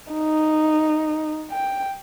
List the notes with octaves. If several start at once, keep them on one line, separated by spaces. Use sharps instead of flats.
D#4
G5